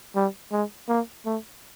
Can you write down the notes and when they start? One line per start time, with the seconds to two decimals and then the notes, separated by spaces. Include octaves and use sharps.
0.16 G3
0.52 G#3
0.89 A#3
1.26 A3